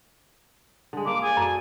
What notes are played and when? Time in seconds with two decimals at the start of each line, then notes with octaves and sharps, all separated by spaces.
0.93 D3 G#3
1.06 A#3 B4 D6
1.22 G#4 D5 G#5
1.37 F#2 A4